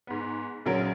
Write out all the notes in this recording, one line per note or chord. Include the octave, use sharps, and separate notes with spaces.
G#2 B3
A#1 C#3 F#3 A#4